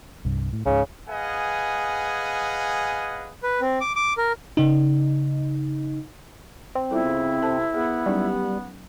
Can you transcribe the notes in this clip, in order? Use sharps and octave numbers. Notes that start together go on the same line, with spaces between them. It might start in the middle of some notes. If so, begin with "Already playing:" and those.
C2 G2
A2
C#2 G#2 C#3
G#4 B4 D#5 F5 F#5 G#5
B4
C4
D6
D6
A#4
C#3 D#4
C4
G3 B3 E4 F4 A4
C#3
C3 A4 C5 A5
B3 G#4
F#3 G3 C#4 D#4